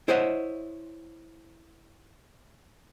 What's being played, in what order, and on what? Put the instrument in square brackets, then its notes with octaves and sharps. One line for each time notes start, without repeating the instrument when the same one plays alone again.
[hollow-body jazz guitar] E4 C5 C#5 D#5 E5 F#5